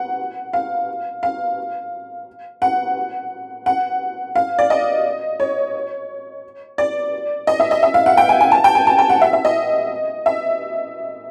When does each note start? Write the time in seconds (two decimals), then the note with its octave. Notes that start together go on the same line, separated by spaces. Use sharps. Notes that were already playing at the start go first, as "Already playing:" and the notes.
Already playing: F#5
0.53 F5
1.23 F5
2.62 F#5
3.66 F#5
4.35 F5
4.59 D5
4.70 D#5
5.40 C#5
6.78 D5
7.47 D#5
7.60 E5
7.71 D#5
7.83 E5
7.94 F5
8.06 F#5
8.17 G5
8.29 G#5
8.41 G#5
8.52 A5
8.64 G5
8.75 G#5
8.87 A5
8.99 G5
9.09 F#5
9.22 E5
9.33 E5
9.45 D#5
10.26 E5